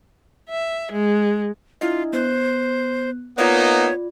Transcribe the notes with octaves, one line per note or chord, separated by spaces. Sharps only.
E5
G#3
D4 E4 F4 D#5
B3 C5 F#6
A#3 B3 D#4 F4 C#5 D5